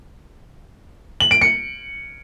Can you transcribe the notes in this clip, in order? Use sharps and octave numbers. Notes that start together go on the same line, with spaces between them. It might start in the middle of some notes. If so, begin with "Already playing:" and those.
F#7
D7
C#7